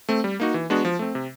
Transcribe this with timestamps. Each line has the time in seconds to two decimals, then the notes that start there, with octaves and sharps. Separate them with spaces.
0.09 A3 C4
0.24 G3
0.40 A#3 D#4 F#4
0.54 E3
0.70 G#3 B3 D4 F#4
0.85 F3
0.99 A3 C4
1.15 C3